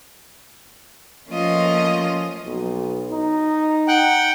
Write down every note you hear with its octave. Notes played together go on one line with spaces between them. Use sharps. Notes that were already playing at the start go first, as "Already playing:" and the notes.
F3 A3 A#3 C#4 F4 D#5
B1
D#4
F#5 G5